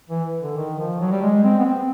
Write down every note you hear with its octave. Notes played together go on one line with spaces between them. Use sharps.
E3
D3
D#3
F3
F#3
G3
G#3
C4
B3
C4